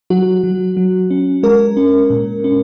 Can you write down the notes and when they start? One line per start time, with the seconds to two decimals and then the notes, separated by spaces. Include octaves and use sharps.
0.10 F#3 F#4
0.44 F#3
0.77 F#3
1.11 C#4
1.43 G#3 A#4
1.77 C#4
2.10 A#2
2.44 C#4